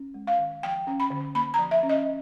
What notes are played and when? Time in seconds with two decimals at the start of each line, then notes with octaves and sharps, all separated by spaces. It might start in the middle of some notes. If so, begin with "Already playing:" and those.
Already playing: C#4
0.14 G#3
0.27 F5
0.38 D#3
0.63 F3 G5
0.87 C#4
1.00 B5
1.10 D3
1.35 A#3 B5
1.54 A#5
1.59 F3
1.71 E5
1.83 C#4
1.89 D#5